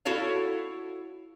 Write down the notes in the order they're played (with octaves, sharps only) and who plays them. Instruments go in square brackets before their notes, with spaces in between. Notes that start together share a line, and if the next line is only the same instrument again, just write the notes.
[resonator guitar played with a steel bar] E4 F#4 A4 C#5 F5